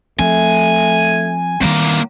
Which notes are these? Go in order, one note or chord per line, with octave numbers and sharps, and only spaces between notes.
F3 A3 C4 G#5
E2 D#3 G3 A#3 C4